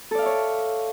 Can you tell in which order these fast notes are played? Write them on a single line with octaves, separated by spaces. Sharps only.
A4 D5 F5 E5 C#5